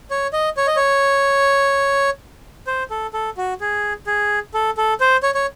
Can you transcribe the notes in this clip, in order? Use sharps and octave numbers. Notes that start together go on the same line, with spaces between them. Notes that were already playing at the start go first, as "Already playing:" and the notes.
C#5
D#5
C#5
D#5
C#5
C5
A4
A4
F#4
G#4
G#4
A4
A4
C5
C#5
C#5